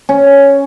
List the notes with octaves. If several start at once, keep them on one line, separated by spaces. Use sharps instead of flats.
C#4